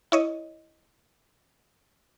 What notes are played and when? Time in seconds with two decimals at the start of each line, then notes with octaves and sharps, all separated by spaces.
0.12 E4 C#5 D#5